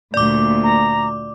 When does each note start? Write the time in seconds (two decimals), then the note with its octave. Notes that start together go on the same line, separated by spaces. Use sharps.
0.14 D2 A#2 D5 D6
0.63 A#5